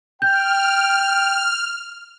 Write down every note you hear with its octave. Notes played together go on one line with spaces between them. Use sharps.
G5 F6 G6